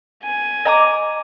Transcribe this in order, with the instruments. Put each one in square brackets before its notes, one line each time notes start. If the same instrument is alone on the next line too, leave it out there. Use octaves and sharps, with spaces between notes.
[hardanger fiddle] G#5
[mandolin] D#5 A#5 D6